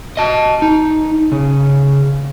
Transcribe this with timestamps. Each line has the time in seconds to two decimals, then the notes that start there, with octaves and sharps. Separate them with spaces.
0.17 D#5 A5
0.62 D#4
1.32 C#3